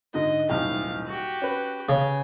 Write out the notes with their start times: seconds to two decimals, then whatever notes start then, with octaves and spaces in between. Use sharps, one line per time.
0.14 G#2 D3 D#5
0.49 D#1 B1 A2 F5
1.08 F#4 G4
1.42 C#4 B4
1.89 C#3